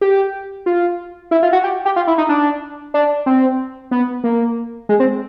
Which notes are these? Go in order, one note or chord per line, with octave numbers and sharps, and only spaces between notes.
G4
F4
E4
F4
F#4
G4
G4
F4
E4
D#4
D4
D4
C4
B3
A#3
G#3
C4